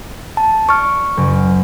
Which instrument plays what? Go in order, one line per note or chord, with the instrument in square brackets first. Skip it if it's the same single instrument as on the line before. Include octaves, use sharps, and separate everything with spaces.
[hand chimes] A5
[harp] D5 [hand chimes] C#6 F6
[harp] F#1